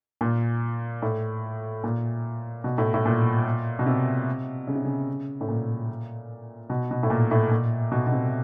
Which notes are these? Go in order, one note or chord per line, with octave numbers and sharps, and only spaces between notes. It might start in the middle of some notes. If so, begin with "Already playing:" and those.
A#2
A2
A#2
B2
A2
A2
A#2
B2
C3
C#3
C3
C#3
A2
A#2
B2
B2
A2
A#2
A2
A#2
B2
B2
C3